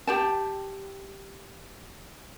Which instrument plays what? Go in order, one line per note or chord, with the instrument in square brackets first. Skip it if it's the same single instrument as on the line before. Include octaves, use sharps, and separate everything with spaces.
[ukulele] G4 G5 A5